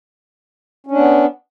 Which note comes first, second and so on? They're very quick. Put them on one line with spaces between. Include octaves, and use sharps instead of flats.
C#4 D4 B3